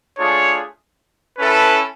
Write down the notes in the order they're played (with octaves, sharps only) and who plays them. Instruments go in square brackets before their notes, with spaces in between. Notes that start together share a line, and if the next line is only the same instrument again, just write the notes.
[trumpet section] A3 D4 F4 G#4 [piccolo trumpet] C#5
[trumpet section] C#4 E4 A4 [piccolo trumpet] B4